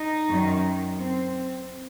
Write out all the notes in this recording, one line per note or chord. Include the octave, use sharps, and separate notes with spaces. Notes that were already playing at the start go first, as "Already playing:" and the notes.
Already playing: D#4
F#2 D#3
C4